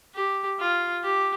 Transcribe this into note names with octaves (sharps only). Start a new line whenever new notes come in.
G4
F4
G4